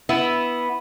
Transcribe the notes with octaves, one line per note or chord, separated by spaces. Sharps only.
B3 E4